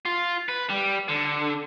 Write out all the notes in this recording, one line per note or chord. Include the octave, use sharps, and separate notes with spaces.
F4
B4
G3
D3